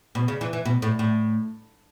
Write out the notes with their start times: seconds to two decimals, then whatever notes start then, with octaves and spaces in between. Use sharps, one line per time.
0.15 B2
0.28 C#3
0.41 E3
0.53 E3
0.65 B2
0.82 A2
0.99 A2